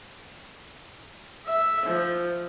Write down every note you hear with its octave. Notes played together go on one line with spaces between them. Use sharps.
E5
F3